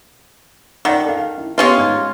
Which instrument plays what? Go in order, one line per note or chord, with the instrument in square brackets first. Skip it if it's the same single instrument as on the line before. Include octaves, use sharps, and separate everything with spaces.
[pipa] D#3 [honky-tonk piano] D5 E5 F#5
[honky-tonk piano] A4 F5
E4
[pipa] G#3 C#4 F4 [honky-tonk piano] B3 G4 B4
[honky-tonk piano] G#2 G#6